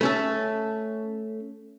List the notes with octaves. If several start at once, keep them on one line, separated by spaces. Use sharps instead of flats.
A3 C#4 A4